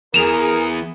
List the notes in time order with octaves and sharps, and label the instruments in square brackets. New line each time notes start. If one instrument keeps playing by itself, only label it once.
[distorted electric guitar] E2 [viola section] G#4 [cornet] A#4 [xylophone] E7 F7